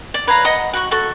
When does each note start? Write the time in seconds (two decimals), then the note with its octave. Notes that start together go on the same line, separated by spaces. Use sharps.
0.14 D5
0.27 B4 C#5 F5 A#5
0.44 D#5 F#5 D#6
0.73 F#4 F#5 C#6
0.91 F#4 A4 C#6